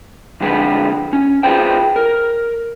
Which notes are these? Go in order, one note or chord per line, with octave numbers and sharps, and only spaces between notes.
F2 D3 G#3 G4 B4
C#4
F4 F#4 G#4 B4 C5 G5
A#4